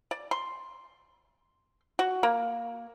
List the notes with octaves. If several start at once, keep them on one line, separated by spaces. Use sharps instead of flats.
D5
C6
F#4
A#3